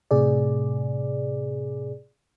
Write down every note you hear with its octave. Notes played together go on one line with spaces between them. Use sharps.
A2 C3 G#4 D5